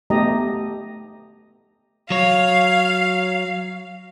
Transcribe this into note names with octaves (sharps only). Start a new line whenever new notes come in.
A3 B3 D#4 G4 D#5 A#5
F#3 C#5 F5